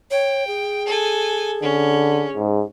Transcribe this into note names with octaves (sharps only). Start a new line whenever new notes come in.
C#5 G5
G#4
A4 G#5
D3 C#4
G#2